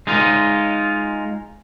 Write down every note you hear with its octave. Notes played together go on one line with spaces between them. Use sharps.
G#3 D#4 F4